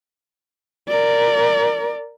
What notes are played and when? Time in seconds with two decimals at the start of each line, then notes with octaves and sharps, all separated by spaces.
0.89 A#4 D5